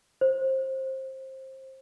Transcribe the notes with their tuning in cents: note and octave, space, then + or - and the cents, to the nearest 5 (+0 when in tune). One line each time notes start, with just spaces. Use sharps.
C5 +20